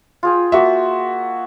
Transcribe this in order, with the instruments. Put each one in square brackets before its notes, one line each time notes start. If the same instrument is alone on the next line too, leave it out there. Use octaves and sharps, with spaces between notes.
[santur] F4 G#4 G5
[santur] A#3 [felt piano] F#4 E5